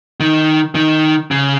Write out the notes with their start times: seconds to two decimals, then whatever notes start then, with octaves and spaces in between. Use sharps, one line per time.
0.20 D#3
0.75 D#3
1.31 C#3